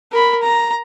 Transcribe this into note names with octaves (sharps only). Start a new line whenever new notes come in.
A#4 B5
A#5